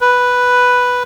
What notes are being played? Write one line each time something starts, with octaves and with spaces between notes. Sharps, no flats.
B4